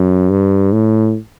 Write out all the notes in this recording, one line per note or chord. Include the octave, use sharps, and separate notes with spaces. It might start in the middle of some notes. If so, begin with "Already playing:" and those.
Already playing: F#2
G2
A2